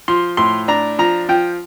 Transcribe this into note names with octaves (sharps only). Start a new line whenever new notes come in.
F3 C6
A2 C6
D4 A#5
F3 A#5
F3 G5